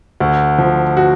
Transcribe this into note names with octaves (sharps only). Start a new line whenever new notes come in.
D2
F3
F#4